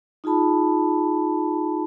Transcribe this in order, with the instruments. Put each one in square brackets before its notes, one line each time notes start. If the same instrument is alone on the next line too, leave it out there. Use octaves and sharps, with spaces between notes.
[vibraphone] D#4 F4 G#4 A5 B5